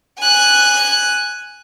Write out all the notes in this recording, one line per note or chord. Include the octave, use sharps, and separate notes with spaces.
G#5 F#6